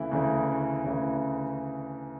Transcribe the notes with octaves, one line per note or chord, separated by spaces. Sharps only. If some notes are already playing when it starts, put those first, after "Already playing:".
Already playing: D2 C#3 E3 E4
D2 C#3 E3
D2 C#3 E3